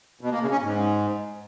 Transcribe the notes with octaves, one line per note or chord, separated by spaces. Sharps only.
B2
A#3
C#3
C#4
G#2